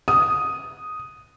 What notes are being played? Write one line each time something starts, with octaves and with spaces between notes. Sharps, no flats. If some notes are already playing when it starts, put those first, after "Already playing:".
D#6